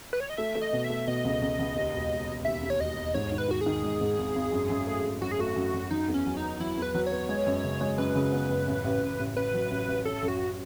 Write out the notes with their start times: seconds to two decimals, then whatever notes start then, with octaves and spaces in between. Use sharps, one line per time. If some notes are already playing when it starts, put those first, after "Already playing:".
0.13 B4
0.20 C#5
0.30 D#5
0.37 A3 E5
0.55 A3
0.61 D#5
0.73 B2
0.84 E5
0.90 A3
1.07 B2 D#5
1.25 C#2
1.42 C#2
1.59 C#2
1.76 D#2
1.94 E1
2.10 E1
2.28 E1
2.45 D#2 E5
2.63 D#2
2.70 C#5
2.80 E1 D#5
2.98 E1
3.14 G#2 C#5
3.32 D#3
3.38 B4
3.48 D#3 F#4
3.61 G#4
3.66 D#3
3.84 G#3
4.01 G#2
4.18 G#1
4.36 G#1
4.52 F#2
4.70 F#2
4.87 A3
5.04 F#2
5.21 F#2 F#4
5.31 G#4
5.39 A3 F#4
5.56 F#2
5.74 F#2
5.91 F#3 D#4
6.08 E2
6.14 C#4
6.26 F#3
6.37 D#4
6.43 B3
6.60 F#3 E4
6.77 E2
6.82 B4
6.95 F#3
7.07 C#5
7.12 B3
7.29 G#3
7.46 F#2
7.64 C#3
7.81 G#3
7.98 F#2 B4
8.15 C#3
8.32 B3
8.50 F#2
8.68 A1
8.84 A1
9.02 A1
9.19 A1
9.36 A1 B4
9.54 F#3
9.71 A1
9.88 A1
10.05 C#4 A4
10.23 F#2
10.28 F#4